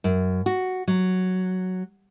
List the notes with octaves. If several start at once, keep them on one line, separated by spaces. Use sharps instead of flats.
F#2
F#4
F#3